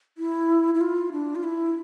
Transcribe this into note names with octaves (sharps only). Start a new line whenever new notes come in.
E4
E4
F4
D4
F4
E4